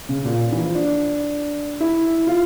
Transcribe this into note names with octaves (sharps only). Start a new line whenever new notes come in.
C#3
A#2
E3
F3
D4
E4
F4